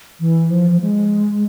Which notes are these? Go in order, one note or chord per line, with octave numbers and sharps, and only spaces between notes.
E3
F3
G#3